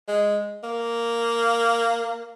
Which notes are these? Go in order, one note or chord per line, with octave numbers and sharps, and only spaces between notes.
G#3
A#3